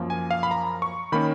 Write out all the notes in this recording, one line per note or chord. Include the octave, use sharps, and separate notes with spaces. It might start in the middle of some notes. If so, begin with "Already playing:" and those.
Already playing: F#2 F3 A#3
G#5
F5
B5
A#5
C#6
D#3 A#3 C#4 B5